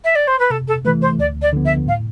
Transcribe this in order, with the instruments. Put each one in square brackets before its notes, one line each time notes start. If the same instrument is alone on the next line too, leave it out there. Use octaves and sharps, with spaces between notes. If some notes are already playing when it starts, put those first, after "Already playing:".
[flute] E5
D5
C5
B4
[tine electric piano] C3 [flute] A4
[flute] A4
[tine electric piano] E3 A3 [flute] B4
[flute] C5
[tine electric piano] D2 [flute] D5
[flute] D5
[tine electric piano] D3 F3 B3
[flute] E5
[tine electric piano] A2 [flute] F5